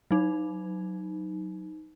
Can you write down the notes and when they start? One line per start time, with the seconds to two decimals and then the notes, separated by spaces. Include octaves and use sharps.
0.11 F#3 D#4